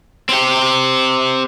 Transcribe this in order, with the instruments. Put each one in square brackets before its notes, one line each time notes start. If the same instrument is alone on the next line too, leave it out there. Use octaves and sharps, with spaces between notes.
[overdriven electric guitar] C4 G4